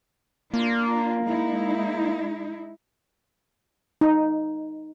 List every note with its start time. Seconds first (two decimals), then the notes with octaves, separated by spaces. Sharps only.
0.54 A#3 D4 F4
1.24 G#3 D#4 E4
4.01 D#4